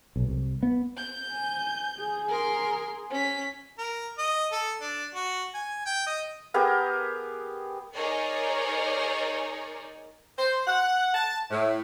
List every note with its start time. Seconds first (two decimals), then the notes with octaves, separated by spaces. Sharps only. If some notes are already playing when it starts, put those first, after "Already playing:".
0.16 B1
0.28 C2
0.63 B3
0.97 G6
1.32 G#5
1.97 G#4
2.28 A#4 C6
3.10 C#4 B6
3.78 A#4
4.18 D#5
4.52 A4
4.81 D4
5.14 F#4
5.54 G#5
5.86 G5
6.07 D#5
6.54 B3 G4 G#4 A#4
7.94 D#4 G#4 A#4 C#5 D5
10.37 C5
10.67 F#5
11.13 A5
11.50 A2